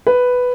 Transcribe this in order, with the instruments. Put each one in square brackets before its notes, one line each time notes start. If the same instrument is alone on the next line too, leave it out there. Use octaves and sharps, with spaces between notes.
[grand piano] B4